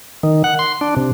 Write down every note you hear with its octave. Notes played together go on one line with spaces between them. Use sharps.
D#3
F#5
C6
D4
C3